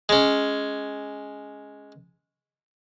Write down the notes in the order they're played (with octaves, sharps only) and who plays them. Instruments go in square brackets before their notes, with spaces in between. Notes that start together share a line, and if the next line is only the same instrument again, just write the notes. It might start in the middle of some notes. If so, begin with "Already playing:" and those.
[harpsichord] G#3 C#4